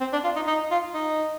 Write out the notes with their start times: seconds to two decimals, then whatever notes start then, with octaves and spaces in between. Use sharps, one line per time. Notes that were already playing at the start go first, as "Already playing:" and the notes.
0.01 C4
0.13 D4
0.24 F4
0.36 D#4
0.47 D#4
0.71 F4
0.94 D#4